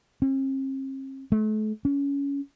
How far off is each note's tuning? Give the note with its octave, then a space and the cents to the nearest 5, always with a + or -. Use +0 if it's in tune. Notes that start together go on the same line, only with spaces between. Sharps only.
C4 +45
A3 -40
C#4 +20